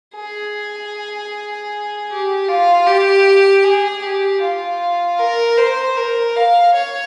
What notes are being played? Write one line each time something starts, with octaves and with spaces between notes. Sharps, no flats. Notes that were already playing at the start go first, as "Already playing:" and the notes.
G#4
G4
F4
G4
G#4
G4
F4
A#4
C5
A#4
F5
C#5